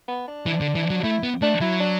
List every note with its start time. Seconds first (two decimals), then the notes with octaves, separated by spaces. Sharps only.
0.08 B3
0.28 D4
0.46 E3
0.61 D3
0.75 E3
0.90 F#3
1.04 A3 E4
1.23 B3
1.42 A3 D4
1.61 F#3 E4
1.80 D4